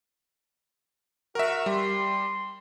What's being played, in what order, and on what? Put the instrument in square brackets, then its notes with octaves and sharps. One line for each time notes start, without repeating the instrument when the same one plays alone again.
[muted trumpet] F#4 [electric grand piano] A#4 E5
[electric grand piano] G3 [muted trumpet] C6